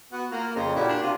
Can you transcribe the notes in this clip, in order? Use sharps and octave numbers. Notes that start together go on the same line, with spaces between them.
B3 F#4 F#5
A#3 F4 A#5
F2 C#3 C5 A#5
A#2 E4 F#4 G4
D4
C3 F4